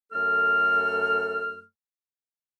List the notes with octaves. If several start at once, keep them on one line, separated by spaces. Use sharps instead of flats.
F#2 A3 A4 F6